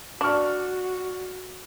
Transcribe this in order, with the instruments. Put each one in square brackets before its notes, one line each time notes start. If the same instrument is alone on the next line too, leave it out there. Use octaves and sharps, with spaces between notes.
[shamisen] D4 [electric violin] F#4 [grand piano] D5 C#6 F6